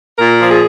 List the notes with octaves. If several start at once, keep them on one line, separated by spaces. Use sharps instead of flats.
A#2 A#4
F3
G#4